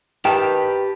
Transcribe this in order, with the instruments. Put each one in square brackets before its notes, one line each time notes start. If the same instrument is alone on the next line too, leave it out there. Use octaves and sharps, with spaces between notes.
[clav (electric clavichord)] D#3 [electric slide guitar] G4 A5 [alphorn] B4 [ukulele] G5